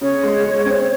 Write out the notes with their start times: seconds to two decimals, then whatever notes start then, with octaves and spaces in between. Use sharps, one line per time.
0.01 C#3 C#5
0.23 G#3
0.44 G#3
0.66 C4